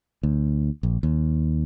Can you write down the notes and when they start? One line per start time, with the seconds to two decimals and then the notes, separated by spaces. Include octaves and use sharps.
0.23 D2
0.83 A#1
1.03 D#2